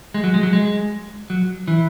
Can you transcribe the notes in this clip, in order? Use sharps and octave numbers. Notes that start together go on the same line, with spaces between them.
G#3
F#3
G#3
F#3
G#3
F#3
E3